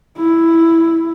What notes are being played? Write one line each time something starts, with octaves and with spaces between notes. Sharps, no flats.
E4